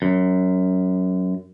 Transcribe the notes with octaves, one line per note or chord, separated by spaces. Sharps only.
F#2